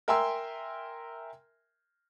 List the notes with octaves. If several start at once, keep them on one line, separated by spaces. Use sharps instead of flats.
A#4 E5 G5 G#5 C6 E6